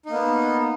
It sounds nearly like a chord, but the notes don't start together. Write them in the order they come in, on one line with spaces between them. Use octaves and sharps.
D#4 A#3 B3